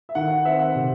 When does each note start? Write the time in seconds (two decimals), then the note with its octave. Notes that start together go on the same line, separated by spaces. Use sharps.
0.09 E5
0.15 D#3 F#5
0.30 F#5
0.45 C4 E5
0.59 F#5
0.75 C3